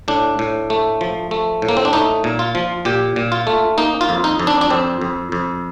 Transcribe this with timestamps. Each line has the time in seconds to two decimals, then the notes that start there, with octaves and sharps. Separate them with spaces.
0.08 A2 D4
0.39 A2
0.70 A3
1.01 F3
1.31 A3
1.62 A2
1.68 A#3
1.77 C4
1.85 D4
1.93 A3 D#4
2.24 A#2
2.39 F4
2.55 F3
2.85 A#2 G4
3.16 A#2
3.32 F4
3.47 A3
3.78 A#3 D#4
4.01 F4
4.09 F2
4.24 D#4
4.39 F2
4.47 D4
4.61 D4
4.70 F2 C4
5.01 F2
5.32 F2